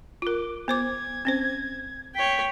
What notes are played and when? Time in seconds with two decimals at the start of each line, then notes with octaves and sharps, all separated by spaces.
0.22 F4 A#4 D6
0.68 B3 C5 D6 G#6
1.25 C4 C#4 C5
2.15 C#5 G5 B6